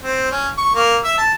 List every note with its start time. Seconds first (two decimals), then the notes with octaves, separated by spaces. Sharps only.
0.04 C4
0.32 C#4
0.58 C#6
0.75 A#3
1.05 E5
1.18 A5